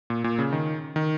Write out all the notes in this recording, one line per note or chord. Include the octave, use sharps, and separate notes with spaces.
A#2
A#2
C#3
D#3
D#3